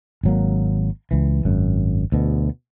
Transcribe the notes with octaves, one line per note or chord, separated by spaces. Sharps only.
G#1 F#3 A#3
C#2 E3
G#1 F#2
D2 B2